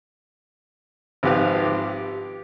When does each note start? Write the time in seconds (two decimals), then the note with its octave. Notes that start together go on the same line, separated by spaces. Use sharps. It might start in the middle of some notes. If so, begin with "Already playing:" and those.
1.23 G#1 F3 G4 B4 F5
1.65 G4